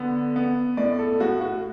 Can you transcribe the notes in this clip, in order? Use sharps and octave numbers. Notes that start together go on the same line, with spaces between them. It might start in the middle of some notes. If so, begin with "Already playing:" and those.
Already playing: D3 B3
B3
A2 D5
A4
A2 F#4
F#4